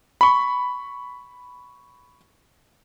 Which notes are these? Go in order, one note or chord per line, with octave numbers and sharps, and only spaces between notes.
B5 C#6